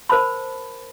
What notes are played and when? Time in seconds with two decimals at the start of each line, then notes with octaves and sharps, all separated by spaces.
0.09 A#4 C5 A5 B5